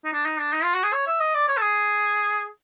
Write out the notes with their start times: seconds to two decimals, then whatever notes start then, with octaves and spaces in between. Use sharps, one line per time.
0.05 D#4
0.13 D4
0.25 D#4
0.40 D4
0.53 D#4
0.63 F4
0.74 F#4
0.84 G#4
0.93 C#5
1.07 E5
1.21 D#5
1.35 D5
1.48 C#5
1.57 A4
1.62 G#4